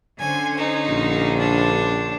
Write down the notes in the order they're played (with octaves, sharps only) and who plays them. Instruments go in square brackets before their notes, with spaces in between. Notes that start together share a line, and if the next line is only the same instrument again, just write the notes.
[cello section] D3 C#4 C5 [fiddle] G#5
[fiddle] D#4
[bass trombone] A#1
[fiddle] D4